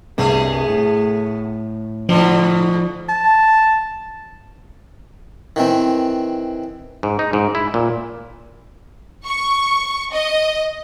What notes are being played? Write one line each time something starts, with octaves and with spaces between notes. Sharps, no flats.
C2 G2 C3 A3 B3 G#4
A2
G#2 B2 D3 F3
A5
D#3 E3 C4
G#2
D#4
G#2
E4
A#2
C#6
D#5